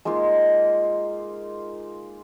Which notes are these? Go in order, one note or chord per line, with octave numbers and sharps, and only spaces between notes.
G#3 A#3 D#4 F4